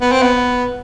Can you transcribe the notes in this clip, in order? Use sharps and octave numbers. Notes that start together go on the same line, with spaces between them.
B3
C4
B3